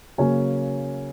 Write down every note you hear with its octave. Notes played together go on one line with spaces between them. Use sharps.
C#3 F#3 A#3 C#4 G#5